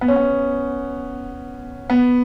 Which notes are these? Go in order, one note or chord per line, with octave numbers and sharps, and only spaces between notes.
B3
C#4
B3
B3